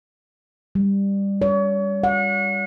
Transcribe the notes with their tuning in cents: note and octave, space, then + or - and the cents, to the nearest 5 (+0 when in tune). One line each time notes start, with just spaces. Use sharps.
G3 +15
C#5 +40
F#5 -35